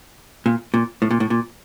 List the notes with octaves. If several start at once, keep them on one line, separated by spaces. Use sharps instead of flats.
A#2
A#2
A2
A#2
A2
A#2